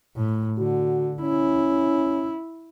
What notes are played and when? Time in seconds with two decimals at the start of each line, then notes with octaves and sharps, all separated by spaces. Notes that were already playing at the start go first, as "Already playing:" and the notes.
0.16 A2
0.59 D3 F#4
1.22 C#4 E4